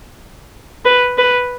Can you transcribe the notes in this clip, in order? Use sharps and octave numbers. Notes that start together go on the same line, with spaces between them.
B4
B4